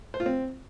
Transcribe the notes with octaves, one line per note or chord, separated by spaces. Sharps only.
C5
F4
C4